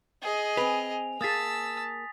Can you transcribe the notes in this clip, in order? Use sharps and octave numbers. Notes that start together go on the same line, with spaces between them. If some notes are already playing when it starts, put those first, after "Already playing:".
G#4 D#5
C4 B4 G#5 F7
A#3 G#4 A5 D#6 E6 A6 B6